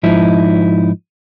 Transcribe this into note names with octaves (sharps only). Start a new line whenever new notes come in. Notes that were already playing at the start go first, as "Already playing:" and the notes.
G#2 F3 D#4 E4